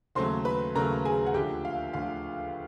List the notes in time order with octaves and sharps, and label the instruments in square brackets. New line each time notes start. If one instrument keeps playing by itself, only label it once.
[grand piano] D#2 C#3 F#3 A3 C#4 C5 C6
B4 B5
D#2 C#3 F#3 A3 C#4 A#4 A#5
G#4 G#5
F#5
D2 D3 F3 G4 G5
F5
D2 D3 F3 F5